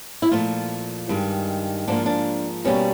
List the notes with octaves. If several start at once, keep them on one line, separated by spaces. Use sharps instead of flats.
E4
A#2 F3 A3 F4
G2 D#3 G#3
G#2 F3 A#3 D4
D4
B2 G3 A#3 C#4